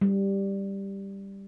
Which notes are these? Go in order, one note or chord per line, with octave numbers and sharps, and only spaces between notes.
G3